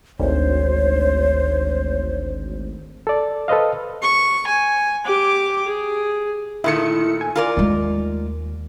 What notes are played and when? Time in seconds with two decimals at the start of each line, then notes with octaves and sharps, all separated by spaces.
0.19 G#1 D2 C5 C#5
3.07 A4 D5
3.48 A4 B4 C5 D#5 F5
4.02 C#6
4.47 G#5
5.05 G4 D6
5.68 G#4
6.64 A#2 D#3 A3 E4 C#7
7.21 G#5
7.36 F4 A#4 D5
7.57 D#2 G#3 A3